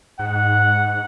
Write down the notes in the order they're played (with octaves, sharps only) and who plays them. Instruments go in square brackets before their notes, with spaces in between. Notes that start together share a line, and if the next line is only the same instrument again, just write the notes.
[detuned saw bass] G#2 [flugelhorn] F#5